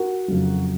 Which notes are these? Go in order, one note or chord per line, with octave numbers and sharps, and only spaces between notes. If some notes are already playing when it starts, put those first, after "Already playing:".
Already playing: F#4 A#4
F#1 F2 C#3 F#3